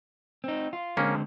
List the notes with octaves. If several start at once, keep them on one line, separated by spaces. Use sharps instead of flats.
C4 D#4
F4
D3 G#3 A#3 C4 C#4